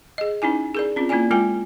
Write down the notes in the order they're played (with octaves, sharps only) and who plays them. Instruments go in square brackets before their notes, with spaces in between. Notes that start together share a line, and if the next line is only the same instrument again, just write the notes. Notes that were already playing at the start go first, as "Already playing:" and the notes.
[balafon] G#4 D#5
C#4 D#4 E4 G#5
G#4 A#4 D5
C4 C#4 F4
A#3 C#4 E4 F4 D5 G#5
G#3 F4 A#4 G5 G#5